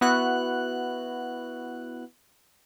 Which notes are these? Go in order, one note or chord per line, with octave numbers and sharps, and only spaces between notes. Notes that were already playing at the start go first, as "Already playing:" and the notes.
B3 E4 F#4 F#6